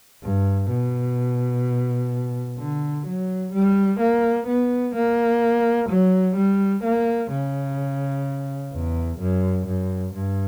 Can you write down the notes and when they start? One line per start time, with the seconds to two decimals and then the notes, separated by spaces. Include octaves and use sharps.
0.22 G2
0.69 B2
2.58 D3
3.06 F#3
3.53 G3
4.00 A#3
4.47 B3
4.95 A#3
5.90 F#3
6.36 G3
6.83 A#3
7.31 C#3
8.73 E2
9.19 F#2
9.67 F#2
10.14 G2